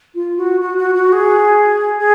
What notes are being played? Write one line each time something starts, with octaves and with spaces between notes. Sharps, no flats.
F4
F#4
F#4
F#4
F#4
G#4
G#4